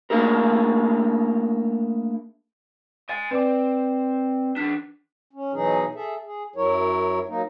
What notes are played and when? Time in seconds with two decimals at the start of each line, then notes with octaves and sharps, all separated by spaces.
0.10 A3 A#3 D4 E4 G#4 A#4
3.09 D#5 G#5 A6
3.31 C4 B4 D5 D6
4.57 E3 D4 B6
5.33 C#4
5.53 B2 E3 F#3 D#4 G#4
5.95 G#4 A4 E5
6.25 G#4
6.56 F#2 F#3 E4 A#4 C#5
7.28 F#3 A#3 D#4